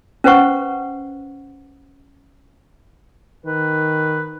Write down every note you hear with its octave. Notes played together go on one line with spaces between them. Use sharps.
C#4 B4 C5 F#5 C#6
D#3 B4